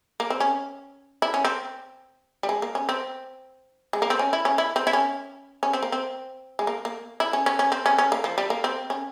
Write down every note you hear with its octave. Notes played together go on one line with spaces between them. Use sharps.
A#3
C4
C#4
E4
C#4
C4
G3
G#3
A#3
C#4
C4
G#3
A#3
C4
C#4
E4
C#4
E4
C4
E4
C#4
C#4
C4
A#3
C4
G#3
A#3
A#3
E4
C#4
C#4
C#4
C4
C#4
C#4
A#3
F3
G3
A#3
C4
C#4